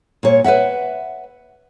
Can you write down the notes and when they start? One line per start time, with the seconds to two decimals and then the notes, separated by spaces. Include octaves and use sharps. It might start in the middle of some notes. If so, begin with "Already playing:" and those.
0.23 A#2 C#5
0.44 B4 C#5 E5 F#5